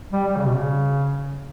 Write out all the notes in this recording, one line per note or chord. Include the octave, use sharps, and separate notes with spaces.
G3
G3
C#3
B2
C#3